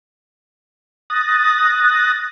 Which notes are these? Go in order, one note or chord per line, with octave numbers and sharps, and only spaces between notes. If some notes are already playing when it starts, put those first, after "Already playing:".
D#6 F#6 A6 A#6